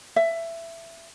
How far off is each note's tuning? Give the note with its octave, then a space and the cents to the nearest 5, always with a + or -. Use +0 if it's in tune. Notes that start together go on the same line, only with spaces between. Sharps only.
E5 +15